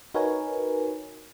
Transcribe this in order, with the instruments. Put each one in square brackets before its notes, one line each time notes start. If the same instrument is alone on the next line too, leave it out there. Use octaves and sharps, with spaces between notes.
[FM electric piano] D#4 F#4 A#4 B4 C#5 G#5